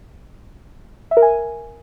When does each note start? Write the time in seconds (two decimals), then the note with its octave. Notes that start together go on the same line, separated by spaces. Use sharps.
1.11 E5
1.17 A#4
1.22 G#5